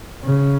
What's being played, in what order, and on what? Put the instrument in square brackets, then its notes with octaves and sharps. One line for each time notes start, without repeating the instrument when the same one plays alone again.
[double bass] C#3